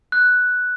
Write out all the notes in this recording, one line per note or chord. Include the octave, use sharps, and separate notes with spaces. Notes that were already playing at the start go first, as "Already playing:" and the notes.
F#6